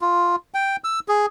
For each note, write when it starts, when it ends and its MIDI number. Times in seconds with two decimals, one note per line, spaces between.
0.02 0.36 65
0.54 0.76 79
0.84 1.00 88
1.08 1.26 68